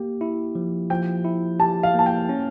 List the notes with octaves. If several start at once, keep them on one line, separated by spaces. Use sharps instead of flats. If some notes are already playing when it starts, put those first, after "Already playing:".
Already playing: A#3 G4
E4
F3
F3 G5
E4
G4 A5
F5
A#3 A5
G5
C#4